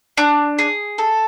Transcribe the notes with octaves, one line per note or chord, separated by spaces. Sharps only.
D4
G#4
A4